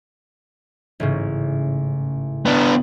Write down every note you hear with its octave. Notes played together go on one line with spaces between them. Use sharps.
A1 G#2 C#3
B3 D4